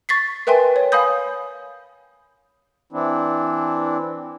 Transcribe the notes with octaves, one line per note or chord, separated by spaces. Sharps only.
C#6 A6 B6 C7
A#4 B4 E5 G5 G#5 C6
C#5
F5 G#5 B5 D#6 G6
E3 C4 D4 E4